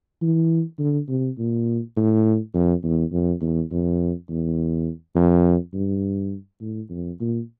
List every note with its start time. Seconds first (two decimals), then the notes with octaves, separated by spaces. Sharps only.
0.22 E3
0.79 D3
1.09 C3
1.38 A#2
1.97 A2
2.54 F2
2.84 E2
3.12 F2
3.41 E2
3.71 F2
4.28 E2
5.16 F2
5.74 G2
6.61 A2
6.90 F2
7.20 A#2